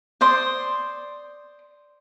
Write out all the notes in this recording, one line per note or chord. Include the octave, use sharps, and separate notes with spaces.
C5 D5 C6 D#6